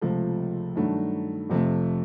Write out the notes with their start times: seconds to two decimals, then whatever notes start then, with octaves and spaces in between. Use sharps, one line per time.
0.02 C#2 C3 F3 A3
0.76 G2 D#3 F#3 A3 D4
1.50 F2 C3 F3 A3